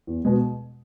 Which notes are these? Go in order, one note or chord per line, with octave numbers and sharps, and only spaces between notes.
E2
B2 G#3